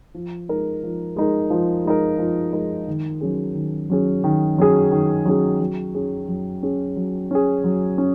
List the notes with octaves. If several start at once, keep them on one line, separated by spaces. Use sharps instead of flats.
F3
G#3 D#4 A#4
F3
G#3 D#4 A#4
F3
G#3 D#4 A#4
F3
G#3 D#4 A#4
D#3
F#3 C#4 G#4
D#3
F#3 C#4 G#4
D#3
F#3 C#4 G#4
D#3
F#3 C#4 G#4
F#3
C#4 G#4
F#3
C#4 G#4
F#3
C#4 G#4
F#3
C#4